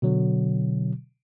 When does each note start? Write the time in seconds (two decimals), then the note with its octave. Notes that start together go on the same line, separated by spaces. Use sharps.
0.02 B2 D3 F#3